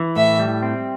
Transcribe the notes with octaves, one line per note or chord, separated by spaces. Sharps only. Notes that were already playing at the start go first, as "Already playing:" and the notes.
Already playing: E3
A2 E5
G3
C4